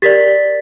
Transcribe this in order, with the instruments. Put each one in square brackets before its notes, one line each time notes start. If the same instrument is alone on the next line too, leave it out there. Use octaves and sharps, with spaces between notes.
[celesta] G4 A#4 D5 A6 B6